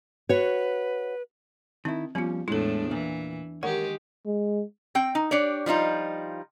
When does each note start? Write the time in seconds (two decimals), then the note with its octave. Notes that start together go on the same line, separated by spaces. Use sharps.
0.29 F#4 B4 C#5
1.85 D#3 C4 E4
2.15 F3 G3 B3 C#4 F4
2.48 E2 A2 G#3 D4 E4 A4
2.91 A#2 E3
3.63 D#3 G#3 G4 A#4 C#5 F#5
4.26 G#3
4.95 C4 G5
5.15 D#4
5.31 D4 G4 C#5 D5
5.66 F3 G3 D#4 F4